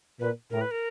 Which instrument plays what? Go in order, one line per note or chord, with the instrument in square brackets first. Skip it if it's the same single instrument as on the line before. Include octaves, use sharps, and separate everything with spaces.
[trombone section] A#2 [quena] B4
[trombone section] A2 [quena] A#4
[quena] B4
A#4